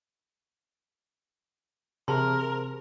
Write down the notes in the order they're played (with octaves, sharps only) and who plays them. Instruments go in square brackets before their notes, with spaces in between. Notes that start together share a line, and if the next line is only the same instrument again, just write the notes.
[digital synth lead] C3 [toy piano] G#4 A5 C6 [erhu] A#4